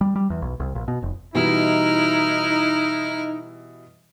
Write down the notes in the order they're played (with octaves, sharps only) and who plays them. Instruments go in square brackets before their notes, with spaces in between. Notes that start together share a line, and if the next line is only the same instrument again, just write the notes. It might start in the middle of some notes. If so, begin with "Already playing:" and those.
[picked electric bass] G3
G3
E2
B1
C2
A#1
B2
F1
[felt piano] B2 E3 G3 [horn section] D#4 [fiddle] E4 F6